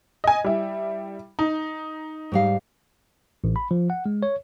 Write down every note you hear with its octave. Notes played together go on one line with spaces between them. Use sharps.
D#5 G#5
G3 E4
D#4
G#2 G3 F5
A1
B5
F3
F#5
G#3
C#5